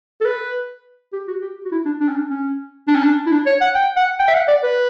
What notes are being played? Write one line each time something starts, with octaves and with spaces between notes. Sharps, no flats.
A4
B4
G4
F#4
G4
F#4
E4
D4
D4
C#4
D4
C#4
D4
C#4
D4
E4
D4
C#5
F#5
G5
F#5
G5
E5
F#5
D5
B4